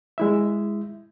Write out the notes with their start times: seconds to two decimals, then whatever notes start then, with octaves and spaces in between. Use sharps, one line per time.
0.18 G#3 E4 E5